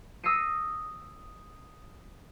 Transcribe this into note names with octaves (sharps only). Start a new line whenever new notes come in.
D#6 E6 A#6 C7 C#7 D#7